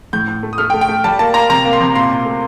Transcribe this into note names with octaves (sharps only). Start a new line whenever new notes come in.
A2 G6
A2
A3
D#6
A3 F6
G5
A3
G5
A3
G3 A5
A#3 A5
A#3 A#5
C3 A#5
A#3
C6
C3
A#2 C6
A#2
A3